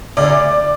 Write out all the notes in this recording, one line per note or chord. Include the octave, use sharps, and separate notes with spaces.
D2 D5